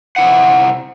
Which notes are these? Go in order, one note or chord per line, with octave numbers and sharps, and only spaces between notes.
C3 E4 F#5